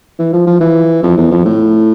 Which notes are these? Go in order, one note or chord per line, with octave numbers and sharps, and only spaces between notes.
E3
F3
F3
E3
F2
E2
F2
A2